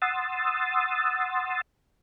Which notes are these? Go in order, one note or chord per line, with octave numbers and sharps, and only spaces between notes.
F#5 C6 D#6 E6 A6